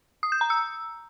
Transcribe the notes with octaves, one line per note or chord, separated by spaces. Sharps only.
D#6
G6
A#5
E6